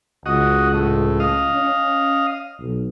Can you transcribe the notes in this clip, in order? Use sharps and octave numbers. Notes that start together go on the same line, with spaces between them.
C#2 F#4 D#5
A2
D#5 F5
C#4
B1